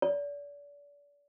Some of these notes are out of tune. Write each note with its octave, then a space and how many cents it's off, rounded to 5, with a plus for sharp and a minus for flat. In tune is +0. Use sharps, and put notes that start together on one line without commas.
D5 -35